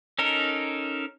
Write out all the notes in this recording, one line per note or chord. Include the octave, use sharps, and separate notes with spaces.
C#4 D#4 A4 A#4